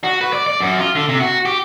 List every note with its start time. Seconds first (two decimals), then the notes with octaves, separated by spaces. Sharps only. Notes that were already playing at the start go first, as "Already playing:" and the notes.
0.04 F#4
0.21 B4
0.33 D5
0.47 D5
0.60 F#2
0.79 F4
0.95 D3
1.09 C3
1.20 F#4
1.45 G4